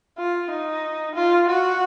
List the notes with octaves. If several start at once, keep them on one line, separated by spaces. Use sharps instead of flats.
F4
D#4
F4
F#4